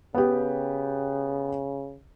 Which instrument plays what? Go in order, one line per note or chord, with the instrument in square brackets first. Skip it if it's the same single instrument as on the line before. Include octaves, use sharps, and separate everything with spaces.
[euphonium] C#3 [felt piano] B3 G4